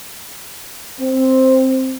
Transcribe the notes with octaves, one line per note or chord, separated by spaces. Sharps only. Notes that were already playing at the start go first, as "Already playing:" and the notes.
C4